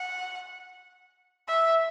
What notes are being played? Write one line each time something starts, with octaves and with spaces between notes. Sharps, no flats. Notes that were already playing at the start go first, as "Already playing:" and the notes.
Already playing: F#5
E5